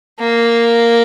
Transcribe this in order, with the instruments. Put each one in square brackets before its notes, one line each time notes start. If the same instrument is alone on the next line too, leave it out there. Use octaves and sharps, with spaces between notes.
[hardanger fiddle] A#3